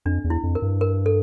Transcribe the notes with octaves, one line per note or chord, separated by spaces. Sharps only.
F2 D4
E2
E4
F2
A#4
G2
A#4
A4